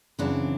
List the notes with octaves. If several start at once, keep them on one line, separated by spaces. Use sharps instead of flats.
F#2 C#3 E3 C4 D4